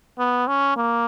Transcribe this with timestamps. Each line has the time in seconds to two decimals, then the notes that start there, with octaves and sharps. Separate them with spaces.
0.18 B3
0.48 C#4
0.77 A#3